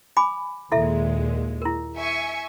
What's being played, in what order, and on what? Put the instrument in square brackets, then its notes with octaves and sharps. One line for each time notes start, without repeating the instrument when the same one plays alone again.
[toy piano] G#5 B5 D6
[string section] D#2 A#2 G#3 [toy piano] E4 A4 E5
[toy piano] E4 A#4
[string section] E5 G#5 C#6